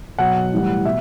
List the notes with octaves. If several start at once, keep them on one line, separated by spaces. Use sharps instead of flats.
B2 F#3 F#5
A2 E3 G3
B2 E5